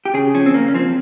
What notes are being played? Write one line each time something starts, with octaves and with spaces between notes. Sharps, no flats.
G4
C#3 G#4
F3 C#4
C4
C#3 A#3
C#4
F3 C4